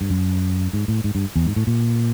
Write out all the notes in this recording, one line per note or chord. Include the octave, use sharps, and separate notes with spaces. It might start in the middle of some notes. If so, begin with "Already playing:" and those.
G2
F#2
G#2
A2
G#2
G2
E2
G#2
A2
A#2